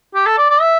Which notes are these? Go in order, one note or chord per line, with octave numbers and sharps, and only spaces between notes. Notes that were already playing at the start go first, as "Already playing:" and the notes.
G4
A4
D5
D5
E5